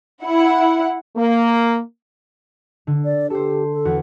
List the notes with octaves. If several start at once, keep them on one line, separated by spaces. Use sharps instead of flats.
E4 F#5
A#3
D3
D5
G4 A4 C5
A4
E2 F#4